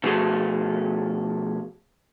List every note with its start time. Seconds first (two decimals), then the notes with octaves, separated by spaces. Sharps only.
0.04 B2 F3 A3 F#4 G#4 A4